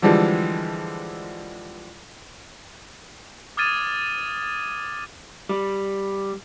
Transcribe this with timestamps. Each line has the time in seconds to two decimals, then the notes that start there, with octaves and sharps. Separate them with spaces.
0.02 D3 E3 F3 G3 G#3
3.57 D6 D#6 F6 G#6 A6 D#7
5.49 G3